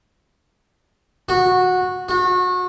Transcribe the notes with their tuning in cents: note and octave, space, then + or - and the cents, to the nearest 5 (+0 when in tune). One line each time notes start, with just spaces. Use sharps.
F#4 -15
F#4 -30